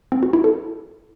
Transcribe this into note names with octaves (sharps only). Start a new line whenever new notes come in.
C4
F#4
E4
A4